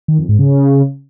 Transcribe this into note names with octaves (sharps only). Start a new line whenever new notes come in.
D#3
F2
G#2
C#3